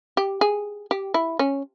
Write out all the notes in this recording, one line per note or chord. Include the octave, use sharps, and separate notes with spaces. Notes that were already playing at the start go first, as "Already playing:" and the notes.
G4
G#4
G4
E4
C#4